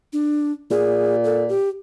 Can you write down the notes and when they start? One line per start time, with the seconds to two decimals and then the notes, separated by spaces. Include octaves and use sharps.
0.13 D4
0.71 A#2 G#4
1.24 A4
1.49 G4